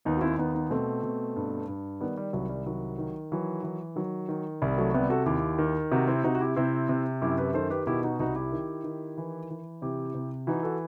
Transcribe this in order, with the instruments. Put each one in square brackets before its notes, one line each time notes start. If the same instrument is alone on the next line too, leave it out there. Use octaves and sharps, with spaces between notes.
[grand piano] D#2 B3 D#4
F#4
C4 E4
D#2 B3 D#4
B3 D#4
B2 A3 C4
B2
G2
G2
D#3 G3 B3
G3
C2 F#3
G3
D#3 F#3
D#3
E3 F#3
E3
D#3 F#3
D#3
C2 G3
F#3 A3
C3 G3 B3
F#4 A4
D#2 E4 G4
D#3
C3 D#4 F#4
C4 E4
C3 D#4 F#4
F#4
E4 G4
C3 C4 E4
C3
F#2 E4 G4
G4 B4
D#3 A4 C5
G4 B4
B2 E4 G4
D#4 F#4
C2 D#4 F#4
E4 G4
D#3
D#3
E3
E3
C3 E4 G4
C3
E3 D#4 F#4
F#4 A4